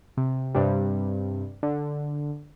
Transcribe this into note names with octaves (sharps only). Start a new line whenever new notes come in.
C3
G2 C3 G3
D3